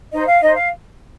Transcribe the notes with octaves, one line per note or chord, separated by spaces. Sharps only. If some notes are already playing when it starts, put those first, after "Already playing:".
D#4 C5 D#5
F5
D#4 C5 D#5
F5